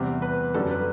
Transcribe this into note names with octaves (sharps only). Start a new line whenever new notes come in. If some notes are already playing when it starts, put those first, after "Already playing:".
Already playing: E2 C3 G3
B4
F#2 D3 G3 A4
B4